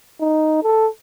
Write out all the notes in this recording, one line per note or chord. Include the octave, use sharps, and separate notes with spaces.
D#4
A4